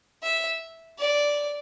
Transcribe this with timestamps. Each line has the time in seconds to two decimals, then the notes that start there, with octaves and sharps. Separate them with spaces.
0.23 E5
0.99 D5